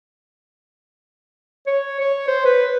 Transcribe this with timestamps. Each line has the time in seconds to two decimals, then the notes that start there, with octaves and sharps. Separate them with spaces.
1.67 C#5
2.01 C#5
2.28 C5
2.45 B4